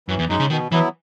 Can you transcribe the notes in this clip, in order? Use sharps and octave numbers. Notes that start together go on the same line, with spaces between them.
F#2 E3
E2
F#2 G#3 D#4
C#3
B2 D#3
E3 F#3 B3 E4